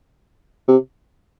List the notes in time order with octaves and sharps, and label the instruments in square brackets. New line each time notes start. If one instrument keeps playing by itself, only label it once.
[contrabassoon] C3